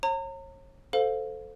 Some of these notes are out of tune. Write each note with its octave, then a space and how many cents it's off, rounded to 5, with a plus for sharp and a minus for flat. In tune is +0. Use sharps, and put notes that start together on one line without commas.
C#5 -35 A#5 -35
A4 +0 C5 -15 F5 +20